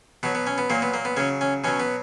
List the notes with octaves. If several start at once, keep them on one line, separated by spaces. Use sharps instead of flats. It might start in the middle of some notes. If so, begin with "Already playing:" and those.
B2 F#3 B3
B3
C#4
B3
A#2 F#3 A#3
B3
A#3
B3
C#3 F#3 C#4
C#4
B2 F#3 C#4
B3